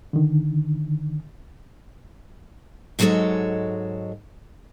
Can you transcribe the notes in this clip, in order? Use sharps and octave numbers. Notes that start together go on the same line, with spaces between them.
D3 D#3
G#2 F#3 G#3 F4 A4 C#5